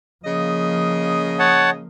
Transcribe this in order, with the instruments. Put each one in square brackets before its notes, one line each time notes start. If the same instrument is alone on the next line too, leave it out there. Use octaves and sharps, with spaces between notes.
[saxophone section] C#3 D#5 [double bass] F3 A#3
[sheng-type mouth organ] C#5 F#5 A5